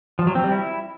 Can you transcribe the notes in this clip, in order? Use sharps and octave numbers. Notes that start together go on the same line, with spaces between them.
F3
F#3
C4
G3
E4